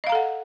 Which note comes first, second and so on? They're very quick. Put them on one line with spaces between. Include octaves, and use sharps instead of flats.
D#5 F5 A#5 A4 F#5